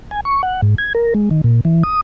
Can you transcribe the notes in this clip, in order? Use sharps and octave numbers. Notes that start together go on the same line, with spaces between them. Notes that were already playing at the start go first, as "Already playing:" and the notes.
G#5
C#6
F#5
G#2
G#6
A#4
G#3
D#3
A#2
E3
D#6